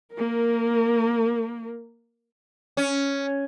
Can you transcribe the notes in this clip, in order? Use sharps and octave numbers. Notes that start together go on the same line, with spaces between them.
A#3 A#4
C#4